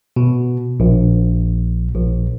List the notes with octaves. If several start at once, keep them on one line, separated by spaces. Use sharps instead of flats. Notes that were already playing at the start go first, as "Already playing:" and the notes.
B2
A#1
A#1